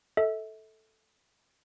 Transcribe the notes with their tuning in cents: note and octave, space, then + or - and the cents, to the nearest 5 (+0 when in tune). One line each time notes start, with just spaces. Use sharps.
A4 +0 E5 -35